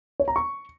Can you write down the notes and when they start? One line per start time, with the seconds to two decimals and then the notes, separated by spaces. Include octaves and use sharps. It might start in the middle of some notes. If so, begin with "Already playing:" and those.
0.20 C#5
0.28 A#5
0.36 C#6